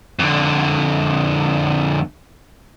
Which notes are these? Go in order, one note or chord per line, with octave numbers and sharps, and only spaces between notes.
F2 D3